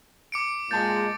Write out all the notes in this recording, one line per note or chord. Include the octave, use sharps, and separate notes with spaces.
D6 C#7 D7
A#2 G#3 A5 G6 A6